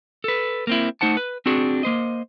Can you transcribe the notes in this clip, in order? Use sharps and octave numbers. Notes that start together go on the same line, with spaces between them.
A4 B4
A#3 C4 E4
A3 D#4 C5 F#5 A5
B4
C4 D4 F#4 G#4
A#3 C5 D#5